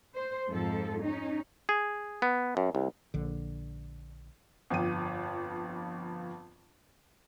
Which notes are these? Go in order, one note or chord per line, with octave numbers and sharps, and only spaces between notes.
C5
F2 G#2 F3 A4
C#4 D#4
G#4
B3
F#2
C2
A#1 D3
G1 F2 G5 D#7